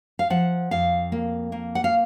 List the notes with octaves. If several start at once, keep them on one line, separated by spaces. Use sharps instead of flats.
F5
F3 F#5
F2 F5
A#3
A#3
F#5
F5